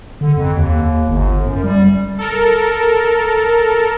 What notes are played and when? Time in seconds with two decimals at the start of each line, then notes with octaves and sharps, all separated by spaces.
0.21 D3
0.37 F2
0.55 D#2
1.08 G1
1.46 F#2
1.64 G3
2.18 A4 A#4